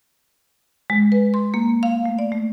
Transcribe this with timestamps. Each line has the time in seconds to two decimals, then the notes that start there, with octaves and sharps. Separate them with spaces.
0.90 G#3
1.12 B4
1.34 C6
1.54 A#3
1.83 F5
2.06 A3
2.19 D5
2.32 A3